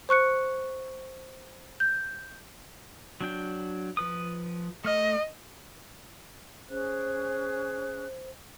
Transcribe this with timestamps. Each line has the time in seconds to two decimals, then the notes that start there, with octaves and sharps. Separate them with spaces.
0.09 C5 C#6 F#6 C#7
1.80 G6
3.21 F#3 D4 G5
3.97 F3 B4 D#6
4.85 A3 D#5 F6
6.70 C#4 G#4 C5 F#6